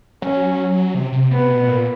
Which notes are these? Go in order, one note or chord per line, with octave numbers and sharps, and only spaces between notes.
F#3 C#4
C3
C3
C3 B3
B2
A#2